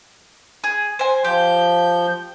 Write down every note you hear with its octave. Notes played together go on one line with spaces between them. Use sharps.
G#4
C5 G#5
F3 G4 G6